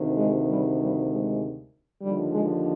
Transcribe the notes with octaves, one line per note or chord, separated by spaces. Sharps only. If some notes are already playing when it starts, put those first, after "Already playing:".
Already playing: D2 C3 D#3
G#3
G3
G3
G#3
D#2 D3 F3 G3
G#3